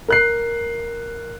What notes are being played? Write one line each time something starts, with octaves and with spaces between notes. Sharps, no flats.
A#4 F#6 C7